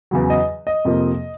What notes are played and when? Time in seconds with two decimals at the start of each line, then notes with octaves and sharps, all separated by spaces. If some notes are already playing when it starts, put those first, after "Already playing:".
0.11 E2 C#3 F#3
0.30 D#5
0.67 D#5
0.85 F2 C3 F3 A#3